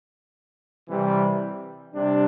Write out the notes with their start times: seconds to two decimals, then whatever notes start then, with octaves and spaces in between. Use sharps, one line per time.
0.88 C3 E3 G3
1.94 C3 G3 D4